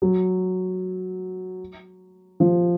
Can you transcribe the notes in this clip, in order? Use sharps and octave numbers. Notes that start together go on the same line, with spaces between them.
F#3
F3